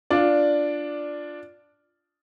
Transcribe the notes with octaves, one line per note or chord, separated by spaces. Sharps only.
D4 F4 D5